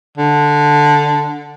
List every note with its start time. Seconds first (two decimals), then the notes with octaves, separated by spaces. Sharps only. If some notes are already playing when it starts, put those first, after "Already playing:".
0.18 D3